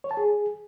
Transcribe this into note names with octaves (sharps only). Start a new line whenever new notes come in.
C#5
A5
G#4